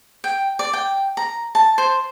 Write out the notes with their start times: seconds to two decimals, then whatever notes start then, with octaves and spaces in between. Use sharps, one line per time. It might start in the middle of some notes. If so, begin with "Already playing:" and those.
0.24 G5
0.59 D5
0.73 G5
1.17 A#5
1.55 A5
1.78 C5